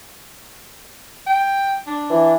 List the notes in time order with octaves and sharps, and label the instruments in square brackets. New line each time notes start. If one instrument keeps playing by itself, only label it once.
[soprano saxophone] G5
D4
[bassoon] E3